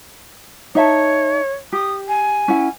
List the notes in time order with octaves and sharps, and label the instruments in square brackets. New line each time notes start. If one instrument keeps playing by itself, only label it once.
[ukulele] D#4 E5 A5 [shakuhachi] C#5
[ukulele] G4 [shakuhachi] D#6
[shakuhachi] G#5
[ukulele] C#4 E4 F#5